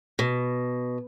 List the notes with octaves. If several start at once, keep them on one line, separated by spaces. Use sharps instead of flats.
B2